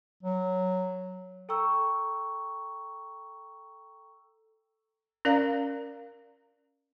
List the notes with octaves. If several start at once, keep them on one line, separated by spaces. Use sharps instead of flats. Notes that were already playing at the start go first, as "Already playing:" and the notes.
F#3
A4 G5 A#5 C#6 E6
C#4 A#4 D5 F5 A#5